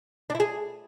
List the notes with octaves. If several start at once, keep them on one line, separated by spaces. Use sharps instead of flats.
D4
E4
G#4